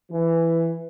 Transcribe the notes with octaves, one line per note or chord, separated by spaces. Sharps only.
E3